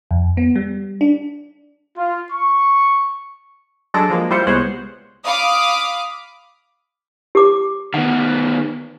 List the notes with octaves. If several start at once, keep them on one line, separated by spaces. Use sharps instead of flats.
F2
B3
G3
D4
F4
C#6
F#3 G#3 D4 A4 A#6 D7
F3 G#3 A#3
G3 E4 F4 C5 G6 C#7
C2 G#3 B3 C5 C#5 F#6
F5 B5 D6 D#6
G4 D6
D#3 B3 F#5